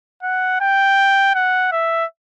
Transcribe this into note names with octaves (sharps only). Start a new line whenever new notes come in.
F#5
G5
F#5
E5